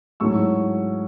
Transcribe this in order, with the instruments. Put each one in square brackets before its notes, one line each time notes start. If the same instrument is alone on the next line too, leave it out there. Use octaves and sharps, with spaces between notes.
[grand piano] G#2 F#3 A3 C#4 E4 C#6 E6